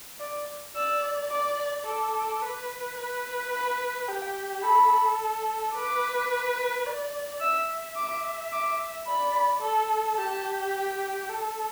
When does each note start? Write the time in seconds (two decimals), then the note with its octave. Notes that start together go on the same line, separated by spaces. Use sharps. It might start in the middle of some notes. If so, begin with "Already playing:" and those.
0.20 D5
0.75 D5 E6
1.31 D5 D6
1.86 A4 D6
2.41 B4
2.97 B4
3.53 B5
4.08 G4 G5
4.63 A4 B5
5.74 B4 D6
6.86 D5
7.40 E5 E6
7.96 D6
8.52 D6
9.07 D5 B5
9.62 A4
10.18 G4 A5
10.73 G5
11.29 A4